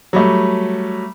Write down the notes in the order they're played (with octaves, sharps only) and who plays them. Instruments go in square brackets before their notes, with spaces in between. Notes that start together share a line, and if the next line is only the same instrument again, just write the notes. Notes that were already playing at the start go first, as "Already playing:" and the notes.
[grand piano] F#3 G3 A3